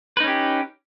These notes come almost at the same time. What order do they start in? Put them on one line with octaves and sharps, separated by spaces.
B4 D#4 C#4 G4